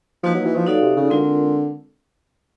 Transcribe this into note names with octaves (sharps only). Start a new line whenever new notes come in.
F3 A#3 D#4 F#4 B4 D#5
F#3
E3
F3
F#3 D#4 F#4 A4 D5 F5
C3
C#3
D3 G#3 C4 F4 A#4